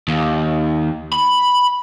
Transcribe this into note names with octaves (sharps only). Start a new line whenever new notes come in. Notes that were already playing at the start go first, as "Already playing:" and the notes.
D#2
B5